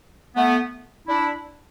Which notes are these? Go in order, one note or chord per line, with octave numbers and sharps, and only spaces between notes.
A3 B3
D4 E4